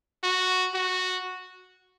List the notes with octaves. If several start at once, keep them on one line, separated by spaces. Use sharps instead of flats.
F#4
F#4